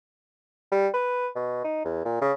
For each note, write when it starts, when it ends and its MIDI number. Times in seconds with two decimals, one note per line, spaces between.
0.72 0.88 55
0.94 1.28 71
1.36 1.62 47
1.64 1.84 63
1.85 2.02 40
2.05 2.17 46
2.21 2.33 49